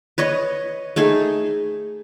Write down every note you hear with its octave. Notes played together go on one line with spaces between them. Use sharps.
B4 C#5 D#5
A3 D#4 G#4